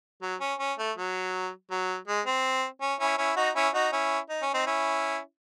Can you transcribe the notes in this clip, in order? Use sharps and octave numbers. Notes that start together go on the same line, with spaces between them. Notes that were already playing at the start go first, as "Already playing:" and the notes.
F#3
C#4
C#4
A3
F#3
F#3
G#3
C4
C#4
C#4 E4
C#4 E4
D#4 F#4
C#4 E4
D#4 F#4
C#4 E4
D#4
C#4
C4 D#4
C#4 E4